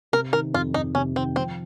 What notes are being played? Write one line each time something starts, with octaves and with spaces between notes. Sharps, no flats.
C3 A#4
D#3 A#4
F2 F4
F2 D#4
C3 C#4
D#3 C4
F3 C4